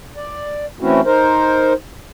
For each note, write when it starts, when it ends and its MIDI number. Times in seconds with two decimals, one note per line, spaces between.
0.16 0.66 74
0.81 1.01 52
0.81 1.01 57
0.81 1.01 60
0.81 1.01 61
0.81 1.01 64
0.81 1.01 66
1.05 1.73 63
1.05 1.73 70
1.05 1.73 72